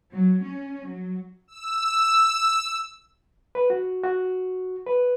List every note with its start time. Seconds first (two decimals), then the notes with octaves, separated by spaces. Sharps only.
0.13 F#3
0.43 C#4
0.88 F#3
1.48 E6
3.55 B4
3.70 F#4
4.04 F#4
4.87 B4